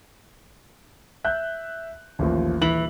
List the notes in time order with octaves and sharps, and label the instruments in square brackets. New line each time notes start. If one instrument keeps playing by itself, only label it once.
[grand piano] E5 F#6 G6
A1 D#2 F3
[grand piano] D#1 F#7 [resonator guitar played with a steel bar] E3